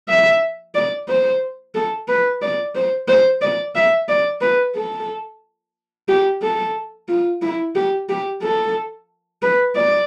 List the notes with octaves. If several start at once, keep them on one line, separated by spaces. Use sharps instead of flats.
E5
D5
C5
A4
B4
D5
C5
C5
D5
E5
D5
B4
A4
G4
A4
F4
E4
G4
G4
A4
B4
D5